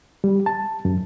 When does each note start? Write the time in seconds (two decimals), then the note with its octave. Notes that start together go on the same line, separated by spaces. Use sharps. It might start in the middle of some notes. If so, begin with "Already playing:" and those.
0.24 G3
0.46 A5
0.85 F#2